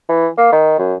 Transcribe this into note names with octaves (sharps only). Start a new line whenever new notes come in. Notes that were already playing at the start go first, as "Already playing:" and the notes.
E3
A#3
D#3
F#2